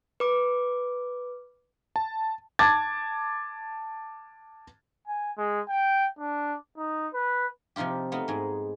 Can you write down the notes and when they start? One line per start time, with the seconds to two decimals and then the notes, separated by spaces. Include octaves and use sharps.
0.20 B4 D6
1.96 A5
2.59 A5 D6 G#6 A6
5.07 G#5
5.37 G#3
5.69 G5
6.19 D4
6.77 D#4
7.14 B4
7.76 C3 F3 D#4 F4 G4
8.12 A3 B3 D#4 F4
8.28 G#2 G#3